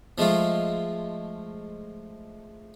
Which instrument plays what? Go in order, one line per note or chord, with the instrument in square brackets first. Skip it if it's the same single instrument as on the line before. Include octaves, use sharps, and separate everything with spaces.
[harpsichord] F3 G#3 A3 F4